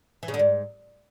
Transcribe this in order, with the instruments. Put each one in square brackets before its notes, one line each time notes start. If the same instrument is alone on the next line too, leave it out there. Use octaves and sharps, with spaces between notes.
[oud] E3
C#3
D3
G#2